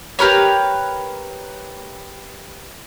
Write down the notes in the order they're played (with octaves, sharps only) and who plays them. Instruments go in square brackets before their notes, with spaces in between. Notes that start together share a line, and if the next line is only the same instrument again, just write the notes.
[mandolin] G4 A#4 B4 C#5